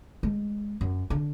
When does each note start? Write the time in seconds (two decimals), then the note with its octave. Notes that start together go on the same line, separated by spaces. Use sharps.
0.23 G#3
0.81 F#2
1.10 D3